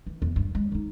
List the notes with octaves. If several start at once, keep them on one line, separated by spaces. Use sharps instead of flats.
E3
E2
G2
G#3
D3 D#4